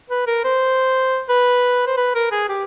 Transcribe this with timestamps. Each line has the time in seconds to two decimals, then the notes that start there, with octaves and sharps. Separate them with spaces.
0.10 B4
0.27 A#4
0.44 C5
1.29 B4
1.87 C5
1.97 B4
2.15 A#4
2.31 G#4
2.49 G4